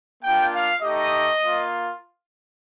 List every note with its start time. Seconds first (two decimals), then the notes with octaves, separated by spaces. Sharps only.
0.24 A#3 D4 F4 G5
0.53 F5
0.82 A3 D#4 G4 D#5
1.42 A#3 F4